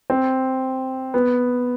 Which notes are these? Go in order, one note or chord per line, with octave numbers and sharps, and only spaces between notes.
C4
B3